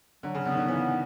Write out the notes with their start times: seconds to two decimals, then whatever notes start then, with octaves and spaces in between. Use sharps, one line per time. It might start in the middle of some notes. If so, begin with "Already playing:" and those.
0.23 D3 F#3
0.35 C#3
0.45 D3 B3
0.52 D#3
0.57 D3
0.68 C#3 E3